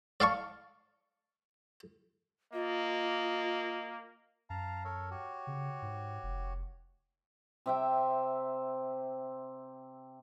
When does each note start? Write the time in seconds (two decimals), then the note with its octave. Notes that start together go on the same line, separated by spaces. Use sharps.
0.20 D5 F5 A5 C#6
2.53 A#3 F4 D#5
4.50 F#2 F5 A5 A#5
4.84 A4 A#4 C#5
5.11 F#4 G4 C#5
5.47 C#3
5.82 G#2
6.23 F1
7.66 C3 E5 G5